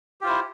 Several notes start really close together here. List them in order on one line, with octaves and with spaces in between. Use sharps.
G4 F4 C5 E4